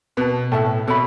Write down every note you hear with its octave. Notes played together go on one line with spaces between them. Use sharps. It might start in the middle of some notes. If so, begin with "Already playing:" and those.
B2 B4 A5
A2 A4 E5 A5
B2 A4 C#5 E5 B5